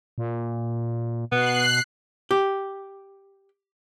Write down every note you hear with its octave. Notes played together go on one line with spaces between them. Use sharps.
A#2
B2 B3 F#6 C7
G4